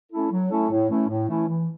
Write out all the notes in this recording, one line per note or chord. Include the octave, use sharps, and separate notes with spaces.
A3 C#4 E4 A4
F#3
A3 C#4 E4 A4
A2
E3 A3 C#4 E4
A2
E3 A3 C#4 E4
E3